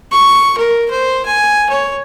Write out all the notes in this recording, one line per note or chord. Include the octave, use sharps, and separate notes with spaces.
C#6
A#4
C5
G#5
C#5